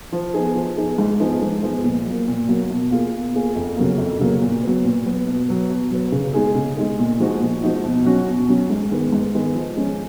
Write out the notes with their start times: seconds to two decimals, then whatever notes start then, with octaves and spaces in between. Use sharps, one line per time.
0.12 F3
0.34 B3 D#4 G#4
0.55 F3
0.77 B3 D#4 G#4
0.98 G#2
1.20 F3 B3 D#4 G#4
1.42 G#2
1.62 F3 B3 D#4 G#4
1.84 A#2
2.06 F#3 A#3
2.28 A#2
2.49 F#3 A#3
2.70 B2
2.91 A#3 F4 G#4
3.13 B2
3.34 A#3 F4 G#4
3.55 F2
3.76 C#3 F#3 A#3
3.98 F2
4.19 C#3 F#3 A#3
4.42 A#2
4.63 F#3 B3
4.85 A#2
5.06 F#3 B3
5.27 B2
5.48 F#3 B3
5.70 B2
5.91 F#3 B3
6.12 C#3
6.34 G#3 D#4 G#4
6.55 C#3
6.77 G#3 D#4 G#4
6.99 A#2
7.20 F3 G#3 D#4 F#4
7.41 A#2
7.63 F3 G#3 D#4 F#4
7.84 B2
8.05 F#3 C#4 F#4
8.27 B2
8.49 F#3 C#4 F#4
8.70 G#2
8.91 D#3 G#3 B3
9.12 G#2
9.34 D#3 G#3 B3
9.55 F3
9.77 G#3 C#4